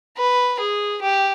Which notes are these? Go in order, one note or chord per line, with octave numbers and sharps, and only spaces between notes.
B4
G#4
G4